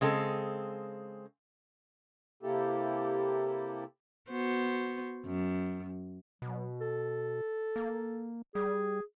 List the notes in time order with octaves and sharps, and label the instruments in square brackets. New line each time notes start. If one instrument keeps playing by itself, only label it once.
[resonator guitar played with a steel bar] C#3 G#3 C4 A4
[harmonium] C3 A#3 E4 G4 A4
[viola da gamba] B3 F#4 C5
F#2
[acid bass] B2 [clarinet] F#3
[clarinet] A4
[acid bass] A#3
[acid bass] G3 [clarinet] G#4